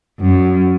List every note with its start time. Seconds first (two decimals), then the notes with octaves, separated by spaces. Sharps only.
0.20 F#2